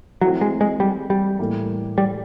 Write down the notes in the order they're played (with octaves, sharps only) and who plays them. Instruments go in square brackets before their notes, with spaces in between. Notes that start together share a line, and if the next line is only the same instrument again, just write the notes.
[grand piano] E3 A3 C4 [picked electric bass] F#3
[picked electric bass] G#3
G#3
G3
G3
[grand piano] A2 E3 G3 A#3
[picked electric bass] G3